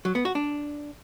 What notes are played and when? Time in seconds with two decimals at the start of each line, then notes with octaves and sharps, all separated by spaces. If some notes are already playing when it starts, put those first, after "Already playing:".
0.05 F#3
0.15 B3
0.25 F#4
0.35 D4